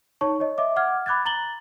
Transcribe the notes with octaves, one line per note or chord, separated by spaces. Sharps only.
D#4 C#5 A5 C#6
C#5 D#5
D#5 E5 D6
F#5 D6 F6 G#6
B5 D6 F#6 G#6 A6
A#5 A6 F#7 G7